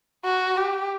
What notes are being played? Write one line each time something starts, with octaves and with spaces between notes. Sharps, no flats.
F#4
G4